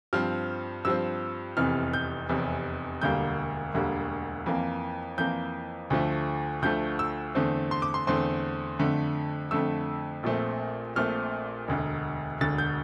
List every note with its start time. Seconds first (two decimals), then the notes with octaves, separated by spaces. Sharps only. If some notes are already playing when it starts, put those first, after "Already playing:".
0.13 G2 F3 C4 F6
0.85 G2 F3 C4 E6
1.57 F1 E2 C3 E3 F6
1.93 G6
2.29 F1 E2 C3 E3
3.02 E1 D2 D3 G3 A#3 G6
3.74 E1 D2 D3 G3 A#3
4.46 F2 E3 A#3
5.18 F2 E3 A#3 G6
5.90 D2 D3 F3 A3
6.62 D2 D3 F3 A3 G6
6.99 E6
7.35 E2 D3 A3 C4
7.71 C6
7.82 D6
7.94 C6
8.07 E2 D3 A3 C4 C6
8.79 F2 D3 A3
9.51 F2 D3 A3 E6
10.23 A#1 A#2 A3 C4
10.96 A#1 A#2 A3 C4 F6
11.68 E1 D2 D3
12.40 E1 D2 D3 A6
12.58 G6